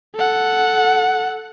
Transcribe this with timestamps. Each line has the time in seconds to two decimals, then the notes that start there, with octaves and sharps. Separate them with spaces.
0.15 A4 F#5